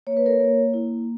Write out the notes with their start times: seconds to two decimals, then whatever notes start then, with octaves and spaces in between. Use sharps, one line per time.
0.07 A#3 C#5
0.17 B4
0.26 A#4 C#5
0.40 A#3
0.74 E4